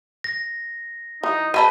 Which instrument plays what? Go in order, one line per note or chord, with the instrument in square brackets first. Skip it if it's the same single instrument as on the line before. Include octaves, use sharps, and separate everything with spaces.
[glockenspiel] A#6
[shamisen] E3 [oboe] D#4
[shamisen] G#3 C4 D#4 [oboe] B4 [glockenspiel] A5 D#7